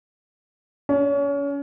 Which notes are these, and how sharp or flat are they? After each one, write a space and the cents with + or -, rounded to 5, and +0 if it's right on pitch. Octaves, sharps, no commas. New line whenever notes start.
C#4 +30